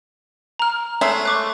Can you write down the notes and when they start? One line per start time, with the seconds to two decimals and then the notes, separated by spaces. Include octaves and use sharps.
0.59 A#5 F6
1.01 G#3 A3 C#5 E5 C7
1.25 C#6 D6 F#6